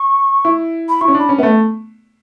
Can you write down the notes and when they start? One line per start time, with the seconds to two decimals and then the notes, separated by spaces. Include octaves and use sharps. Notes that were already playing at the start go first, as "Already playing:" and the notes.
Already playing: C#6
0.45 E4
0.89 B5
1.01 E4 C#6
1.08 C#4
1.15 D4 B5
1.29 C#4
1.38 A3 B3 E5